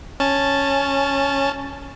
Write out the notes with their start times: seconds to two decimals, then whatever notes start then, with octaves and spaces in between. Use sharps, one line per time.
0.20 C#4 A5